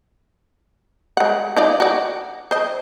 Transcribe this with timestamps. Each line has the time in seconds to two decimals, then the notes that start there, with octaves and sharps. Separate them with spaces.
1.17 G#3 F#5
1.56 D#4 F4 D5
1.80 F#4 D5
2.51 C5 D#5